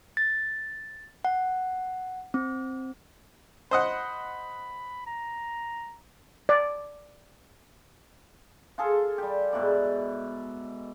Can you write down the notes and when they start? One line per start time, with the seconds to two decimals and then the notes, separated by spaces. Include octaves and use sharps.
0.17 A6
1.25 F#5
2.34 C4
3.71 C5 D#5 F#5 B5
5.06 A#5
6.49 D5
8.78 F4 G#4 A4
9.18 G3 G4
9.53 G#2 B2 E4 D5